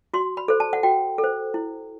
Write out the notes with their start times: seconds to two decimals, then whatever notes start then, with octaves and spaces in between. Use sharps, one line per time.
0.14 F#4 C6
0.37 B5
0.48 A4 C5
0.60 A5
0.73 F#5
0.83 F#4 G5
1.18 A4
1.24 C5
1.54 E4